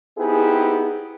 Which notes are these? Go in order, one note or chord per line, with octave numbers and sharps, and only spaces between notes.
B3 C4 D#4 E4 G4 G#4